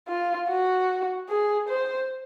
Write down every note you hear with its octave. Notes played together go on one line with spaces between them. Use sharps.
F4
F#4
G#4
C5